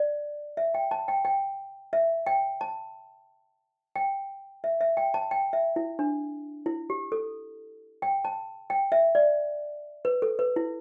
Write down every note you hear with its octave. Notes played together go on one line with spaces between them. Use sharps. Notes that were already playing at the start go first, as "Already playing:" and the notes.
Already playing: D5
E5
G5
A5
G5
G5
E5
G5
A5
G5
E5
E5
G5
A5
G5
E5
E4
D4
E4
G4
A4
G5
A5
G5
E5
D5
B4
A4
B4
E4